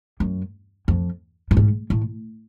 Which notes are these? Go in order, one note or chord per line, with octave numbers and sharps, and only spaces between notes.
F#2
F2
A2
G#2
A2